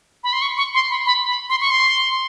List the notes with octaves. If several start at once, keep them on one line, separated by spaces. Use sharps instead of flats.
B5
C6
C#6
C#6
C6
B5
B5
B5
C6
C#6
C6